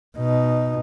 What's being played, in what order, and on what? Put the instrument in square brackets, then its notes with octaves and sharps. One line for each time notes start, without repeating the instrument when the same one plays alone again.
[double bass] B2 D#4